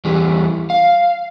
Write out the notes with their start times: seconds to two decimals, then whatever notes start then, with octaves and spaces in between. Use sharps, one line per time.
0.05 E2 E3 G3
0.70 F5